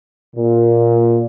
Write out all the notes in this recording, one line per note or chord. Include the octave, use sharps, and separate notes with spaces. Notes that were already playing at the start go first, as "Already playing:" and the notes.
A#2